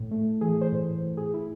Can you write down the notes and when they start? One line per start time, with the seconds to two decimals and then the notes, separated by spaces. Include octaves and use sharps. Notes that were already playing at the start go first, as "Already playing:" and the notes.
Already playing: A2
0.11 A3
0.41 E3 G#4
0.61 C5
0.72 A2
1.03 A2
1.17 G#4
1.33 A2 E4